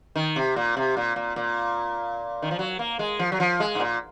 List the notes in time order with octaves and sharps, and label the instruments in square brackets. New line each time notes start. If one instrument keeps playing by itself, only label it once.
[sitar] D#3
C3
A#2
C3
A#2
A#2
A#2
D#3
F3
F#3
A#3
G#3
F3
F#3
F3
G#3
G#2
A#2